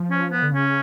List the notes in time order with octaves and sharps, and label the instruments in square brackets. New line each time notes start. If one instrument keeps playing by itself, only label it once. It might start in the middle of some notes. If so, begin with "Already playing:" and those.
Already playing: [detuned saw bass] F3
[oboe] C#4
B3
[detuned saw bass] D3
[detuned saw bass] C#3 [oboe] C#4